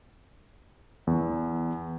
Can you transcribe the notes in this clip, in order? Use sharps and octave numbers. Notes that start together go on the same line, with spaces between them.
E2